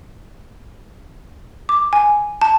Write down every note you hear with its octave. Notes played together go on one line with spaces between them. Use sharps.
D6
G#5
A5